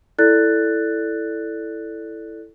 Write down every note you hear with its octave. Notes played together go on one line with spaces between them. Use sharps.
E4 A4 D5 F#6 A6